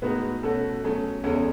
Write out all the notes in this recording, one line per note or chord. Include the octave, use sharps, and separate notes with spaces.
A2 G#3 B3 D#4 F#4 B4
B2 A3 C#4 F#4 A4
B2 F#3 A3 C#4 G#4
E2 C#3 G#3 C#4 A4